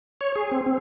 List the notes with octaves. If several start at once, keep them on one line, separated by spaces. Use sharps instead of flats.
C#5
G#4
C4
C4